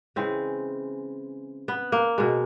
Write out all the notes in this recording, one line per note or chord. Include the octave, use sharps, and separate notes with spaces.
C#3 E3 G#3 C4
B3
A#3
B2 G#3